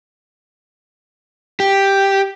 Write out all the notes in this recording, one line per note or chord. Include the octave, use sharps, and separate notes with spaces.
G4